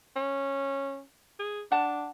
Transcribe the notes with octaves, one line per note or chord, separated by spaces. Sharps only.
C#4
G#4
D4 F#5 A5